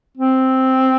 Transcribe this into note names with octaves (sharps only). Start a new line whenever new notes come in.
C4